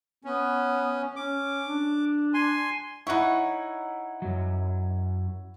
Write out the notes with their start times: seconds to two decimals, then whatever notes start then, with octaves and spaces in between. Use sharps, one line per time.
0.24 B3 C#4
1.16 C#4 D6
1.65 D4
2.34 G#5 C6
3.07 D#4 E4 C#5 F#5 B5
4.22 F#2 F#3